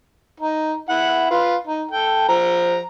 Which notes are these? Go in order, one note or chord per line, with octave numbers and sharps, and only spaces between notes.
D#4
E4 F#5
F4 B4
D#4
A4 G5
F3 A#5